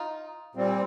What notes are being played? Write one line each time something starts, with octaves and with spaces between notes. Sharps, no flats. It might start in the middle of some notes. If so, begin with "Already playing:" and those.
Already playing: D#4 F4
A#2 G3 C4